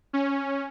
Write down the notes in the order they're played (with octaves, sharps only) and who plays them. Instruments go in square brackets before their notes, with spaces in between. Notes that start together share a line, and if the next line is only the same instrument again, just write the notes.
[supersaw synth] C#4